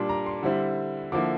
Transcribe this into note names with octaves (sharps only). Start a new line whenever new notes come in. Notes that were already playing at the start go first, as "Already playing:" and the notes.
Already playing: A#2 G3 D4 D6
A#5
C6
D3 G3 C4 E4
D3 F3 A#3 E4 D6